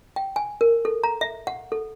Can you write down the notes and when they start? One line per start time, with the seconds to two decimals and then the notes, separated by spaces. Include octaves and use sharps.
0.16 G5
0.36 G#5
0.61 A#4
0.85 A4
1.04 A#5
1.21 E5
1.47 F#5
1.72 A4